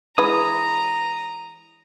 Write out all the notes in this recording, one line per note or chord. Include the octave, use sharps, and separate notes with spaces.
E3 G#3 B4 A#5 D#6